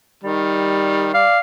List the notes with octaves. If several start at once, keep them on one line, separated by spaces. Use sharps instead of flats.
D#3 G3
D5 F5